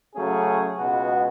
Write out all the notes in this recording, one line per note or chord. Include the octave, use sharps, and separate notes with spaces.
C#3 F#3 A3 C#4 G#4
C#2 B2 G#3 B3 F#4